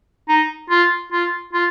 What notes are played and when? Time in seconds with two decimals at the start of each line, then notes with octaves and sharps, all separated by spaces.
0.29 D#4
0.70 F4
1.12 F4
1.53 F4